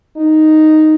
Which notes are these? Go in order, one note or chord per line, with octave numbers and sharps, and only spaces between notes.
D#4